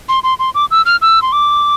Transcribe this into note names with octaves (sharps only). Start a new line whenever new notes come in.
C6
C6
C6
D6
E6
F6
E6
C6
D6